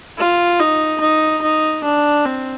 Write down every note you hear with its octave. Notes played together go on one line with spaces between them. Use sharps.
F4
D#4
D#4
D#4
D4
C4